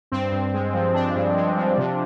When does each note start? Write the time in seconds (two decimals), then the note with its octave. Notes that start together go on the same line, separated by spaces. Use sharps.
0.12 G2 C4
0.32 G2
0.54 G#3
0.74 F3
0.94 G2 D4
1.16 G2
1.36 G#3
1.57 F3
1.78 C3